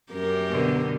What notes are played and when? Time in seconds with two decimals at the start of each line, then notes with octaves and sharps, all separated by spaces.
0.12 F#2 G4 A#4
0.51 B2 D3 B3